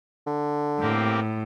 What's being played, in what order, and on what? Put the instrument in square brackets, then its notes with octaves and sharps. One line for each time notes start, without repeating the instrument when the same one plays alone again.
[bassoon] D3
[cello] A2 [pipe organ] A#3 C4 G4